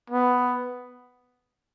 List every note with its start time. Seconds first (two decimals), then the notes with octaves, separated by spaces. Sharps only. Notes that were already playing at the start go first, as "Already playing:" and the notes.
0.10 B3